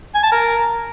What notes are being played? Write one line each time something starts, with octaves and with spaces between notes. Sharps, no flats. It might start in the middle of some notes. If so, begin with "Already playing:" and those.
G#5
A5
A#4